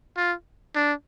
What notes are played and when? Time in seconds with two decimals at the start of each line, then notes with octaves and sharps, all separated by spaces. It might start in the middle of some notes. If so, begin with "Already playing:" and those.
0.17 F4
0.76 D4